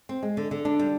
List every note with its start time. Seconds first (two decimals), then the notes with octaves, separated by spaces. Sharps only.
0.09 C4
0.23 G#3
0.37 D3
0.51 D3
0.65 D4
0.79 G3